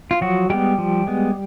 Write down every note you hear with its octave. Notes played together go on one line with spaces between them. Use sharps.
F4
F3 F#3 F#4
G3 G#3 B3 G4
F3
G#3 B3